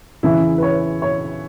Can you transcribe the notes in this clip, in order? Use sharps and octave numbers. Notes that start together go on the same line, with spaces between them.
E2 C#3 E3 E4
B4
C#5
C#5